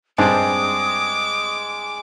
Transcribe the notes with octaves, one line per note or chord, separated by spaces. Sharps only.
G2 G#3 C4 A5 D6 D#6